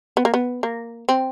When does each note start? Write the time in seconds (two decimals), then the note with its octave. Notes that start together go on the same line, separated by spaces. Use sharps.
0.17 B3
0.25 A#3
0.34 B3
0.63 A#3
1.09 C4